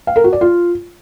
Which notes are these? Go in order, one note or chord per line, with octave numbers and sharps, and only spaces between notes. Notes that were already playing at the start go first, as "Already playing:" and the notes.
F5
A#4
F#4
D5
F4